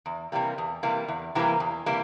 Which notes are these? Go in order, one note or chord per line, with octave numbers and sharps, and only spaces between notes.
E2
C3 E3 G3 A#3
E2
C3 E3 G3 A#3
E2
C3 E3 G3 A#3
E2
C3 E3 G3 A#3